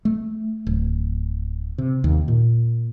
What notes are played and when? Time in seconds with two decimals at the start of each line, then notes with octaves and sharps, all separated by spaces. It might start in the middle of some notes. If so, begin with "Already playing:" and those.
0.05 A3
0.67 D1
1.78 C3
2.04 D#2
2.28 A#2